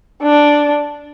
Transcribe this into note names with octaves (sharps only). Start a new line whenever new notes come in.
D4